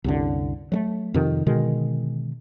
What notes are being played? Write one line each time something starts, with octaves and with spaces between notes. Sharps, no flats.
C2 F#2 D3
F#3 G#3 A3
F2 C3 D#3
B2 D3 D#3 G#3